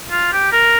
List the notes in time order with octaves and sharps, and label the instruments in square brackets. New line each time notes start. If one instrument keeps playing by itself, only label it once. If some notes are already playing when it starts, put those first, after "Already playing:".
[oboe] F4
G4
A#4